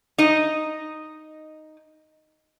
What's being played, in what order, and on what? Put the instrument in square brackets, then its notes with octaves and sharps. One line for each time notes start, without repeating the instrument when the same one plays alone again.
[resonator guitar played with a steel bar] D#4 D#5